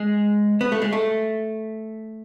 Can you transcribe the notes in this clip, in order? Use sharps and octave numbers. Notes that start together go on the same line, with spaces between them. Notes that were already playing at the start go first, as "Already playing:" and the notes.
Already playing: G#3
B3
A3
G#3
A3